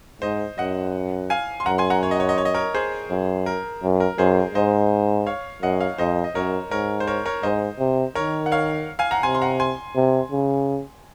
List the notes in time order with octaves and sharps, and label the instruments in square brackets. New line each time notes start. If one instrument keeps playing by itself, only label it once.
[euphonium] G#2 [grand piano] C5 D#5
[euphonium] F#2 [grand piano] D#5 F#5
[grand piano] F5 G#5
C6
[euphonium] F#2 [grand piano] F#5 A#5
[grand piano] G#5 C6
F#5 A#5
C#5
D#5
C#5
D#5
C#5
D#5
A#4 C#5
G#4 C5
[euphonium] F#2
[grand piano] A#4
[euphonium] F#2
[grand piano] A#4
[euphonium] F#2 [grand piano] G#4 C5
[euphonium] G#2 [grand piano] C5 D#5
[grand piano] C#5 F5
[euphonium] F#2 [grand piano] D#5 F#5
[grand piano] C#5 F5
[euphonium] F2 [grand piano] C5 D#5
[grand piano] D#5
[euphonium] F#2 [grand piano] A#4 C#5
[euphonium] G#2 [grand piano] A#4 C#5
[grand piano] C5
A#4 C#5
A#4 C#5
[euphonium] G#2 [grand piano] C5 D#5
[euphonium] C3
[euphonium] D#3 [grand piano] A#4 C#5
[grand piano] F#5
C#5 F5
F5 G#5
F#5 A#5
[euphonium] C3 [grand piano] G#5 C6
[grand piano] C6
F#5 A#5
G#5 C6
[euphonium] C3
C#3